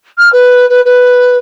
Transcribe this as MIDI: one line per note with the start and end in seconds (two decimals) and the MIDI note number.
0.18 0.29 89
0.33 0.68 71
0.69 0.81 71
0.85 1.38 71